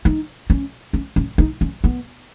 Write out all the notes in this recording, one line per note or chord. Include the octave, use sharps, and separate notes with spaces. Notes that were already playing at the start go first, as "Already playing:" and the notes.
D#4
C#4
C#4
C#4
D#4
C#4
B3